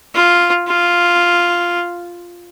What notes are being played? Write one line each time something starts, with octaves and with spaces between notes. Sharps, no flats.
F4
F4